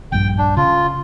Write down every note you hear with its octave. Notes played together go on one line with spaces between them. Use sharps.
A#1 G2 G5
D4
C#3 F4